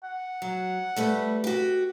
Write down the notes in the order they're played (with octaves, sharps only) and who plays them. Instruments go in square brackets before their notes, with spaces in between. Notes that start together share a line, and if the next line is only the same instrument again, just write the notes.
[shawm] F#5
[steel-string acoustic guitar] F#3
G3 A3 B4
F#4 G4